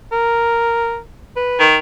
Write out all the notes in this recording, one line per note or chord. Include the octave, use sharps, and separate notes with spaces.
A#4
B4
D#3